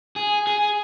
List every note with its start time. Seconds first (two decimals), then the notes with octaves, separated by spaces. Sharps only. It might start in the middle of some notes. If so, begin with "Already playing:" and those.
0.16 G#4
0.47 G#4